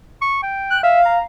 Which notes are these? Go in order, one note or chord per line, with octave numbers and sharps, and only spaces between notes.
C#6
G5
F#6
E5 F5
A#5